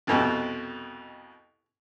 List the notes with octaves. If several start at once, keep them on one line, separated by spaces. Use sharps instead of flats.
C2 F2 B2